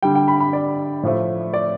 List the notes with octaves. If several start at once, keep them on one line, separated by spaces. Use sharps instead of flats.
D3 G3 G5
G5
B5
B5
D5
A2 F3 A3
D5